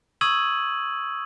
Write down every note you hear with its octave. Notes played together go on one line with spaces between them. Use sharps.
C#6 D#6 E6 G#6 D#7 F#7